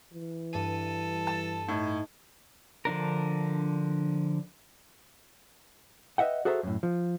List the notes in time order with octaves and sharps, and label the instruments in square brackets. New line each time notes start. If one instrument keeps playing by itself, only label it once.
[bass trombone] E3
[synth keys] G2 D#7 [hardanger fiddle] A4
[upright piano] A5
[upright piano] A2 [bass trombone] D#4
[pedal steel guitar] D3 F3 D4 A#4
[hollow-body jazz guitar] B4 D#5 E5 F#5 G5
F#4 G#4 A4 C5 E5 A#5
F#2 A2
F3